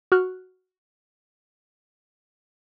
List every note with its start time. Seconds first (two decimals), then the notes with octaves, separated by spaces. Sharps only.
0.12 F#4 C#6 F6 F#6